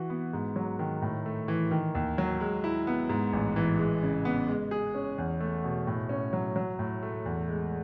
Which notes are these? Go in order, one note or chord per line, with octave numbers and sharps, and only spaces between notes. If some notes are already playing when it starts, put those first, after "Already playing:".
Already playing: E3 F#4
B3
G#2
F#3
D#3
A2
A3
E3
D#3
D#2
F#3
G#3
E4
B3
G#2
A1
E3
G#3
C#3
B3
G#3
G#4
C#4
E2
A3
B2
A2
C#4
F#3
F#3
A2
A3
E2
G#3